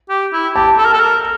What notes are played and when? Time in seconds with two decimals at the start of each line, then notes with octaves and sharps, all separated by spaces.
0.10 G4
0.33 E4
0.55 G4 A5
0.78 A4
0.85 A#4
0.93 A4
1.00 A#4